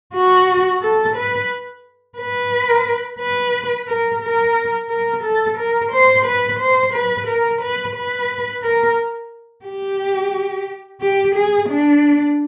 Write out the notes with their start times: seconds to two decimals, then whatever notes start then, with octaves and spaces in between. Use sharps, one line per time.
0.14 F#4
0.82 A4
1.17 B4
2.18 B4
3.20 B4
3.88 A#4
4.22 A#4
4.90 A#4
5.23 A4
5.58 A#4
5.92 C5
6.26 B4
6.60 C5
6.94 B4
7.28 A#4
7.62 B4
7.96 B4
8.63 A#4
9.65 G4
11.01 G4
11.35 G#4
11.69 D4